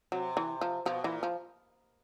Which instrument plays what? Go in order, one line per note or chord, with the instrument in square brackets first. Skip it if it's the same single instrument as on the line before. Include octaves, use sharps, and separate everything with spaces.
[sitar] C3 [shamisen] F#3
[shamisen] E3
F3
[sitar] B2 [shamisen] F3
[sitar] A#2 [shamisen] E3
[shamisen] F3